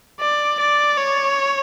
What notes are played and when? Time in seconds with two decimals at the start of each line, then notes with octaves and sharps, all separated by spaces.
0.20 D5
0.60 D5
0.98 C#5